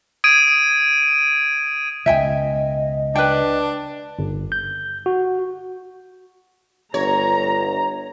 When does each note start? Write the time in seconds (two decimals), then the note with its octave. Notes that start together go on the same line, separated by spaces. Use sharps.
0.24 D#6 G#6 D7 D#7
2.06 C#2 B2 D#5 E5 G5 G#5
3.15 D4 B4 G5
4.19 G1
4.52 G6
5.06 F#4
6.94 G1 C#5 A#5